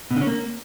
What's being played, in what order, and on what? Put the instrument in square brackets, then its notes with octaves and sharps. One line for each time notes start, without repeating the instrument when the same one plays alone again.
[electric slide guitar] B2
D3
C#4
A#3